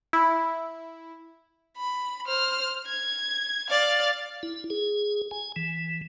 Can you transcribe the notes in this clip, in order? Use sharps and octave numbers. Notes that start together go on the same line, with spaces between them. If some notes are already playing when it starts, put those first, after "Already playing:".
E4
B5
C5 F6
G#6
D5 F5
E4
G#4
G#5
E3